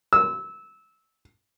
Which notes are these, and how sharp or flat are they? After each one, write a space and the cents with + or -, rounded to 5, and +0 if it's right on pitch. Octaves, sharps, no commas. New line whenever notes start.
E6 -20